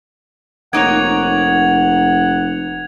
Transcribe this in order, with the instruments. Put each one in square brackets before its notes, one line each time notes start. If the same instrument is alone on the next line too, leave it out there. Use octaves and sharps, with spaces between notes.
[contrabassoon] F1 [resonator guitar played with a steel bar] A#3 D#4 C#5 [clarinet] F#5 [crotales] G#6 F7